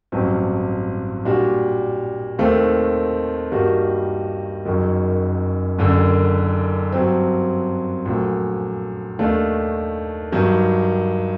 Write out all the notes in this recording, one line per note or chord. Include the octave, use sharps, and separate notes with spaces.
A1 G2 F#3 C4
A#2 G3 D4 F#4
D#2 D#3 A3 C4
G2 D#3 G3 A#3 F#4
F#1 F#2 D#3 F#3
F#1 F#2 D3
G2 F#3 C4
A#1 A#2 F#3 A3
D#2 D#3 A3 D4
G2 D#3 F#3